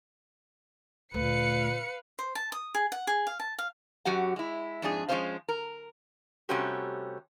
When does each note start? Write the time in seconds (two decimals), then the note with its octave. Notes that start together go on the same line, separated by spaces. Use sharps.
1.14 D2 A#2 A3 B4 F5 C#7
2.19 C5
2.35 A5
2.52 D#6
2.75 G#4
2.92 F#5
3.07 G#4
3.27 F5
3.40 A5
3.58 F5
4.05 F#2 F#3 F#4 G4 F#5
4.36 G#3 E4
4.82 F2 G#2 D4 G#4
5.09 F3 G#3 C#4 D#4 C5 F5
5.48 A#4
6.49 C3 G3 A3 C#4 F#4 G4